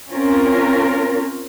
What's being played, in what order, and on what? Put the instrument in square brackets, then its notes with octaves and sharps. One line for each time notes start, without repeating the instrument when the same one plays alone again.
[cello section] C4 C#4 F4 A#4